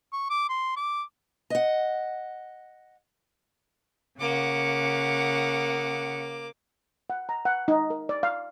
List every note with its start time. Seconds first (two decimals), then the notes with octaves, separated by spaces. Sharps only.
0.13 C#6
0.30 D6
0.49 C6
0.77 D6
1.50 D#5 F#5
4.19 C#3 A#3 F#5 D6
7.10 F#5
7.29 A#5
7.45 F#5
7.68 D#4
7.90 A#4
8.09 D5
8.23 F5